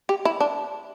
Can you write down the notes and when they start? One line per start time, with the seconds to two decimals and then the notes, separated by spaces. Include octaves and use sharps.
0.09 G4
0.25 E4
0.40 D4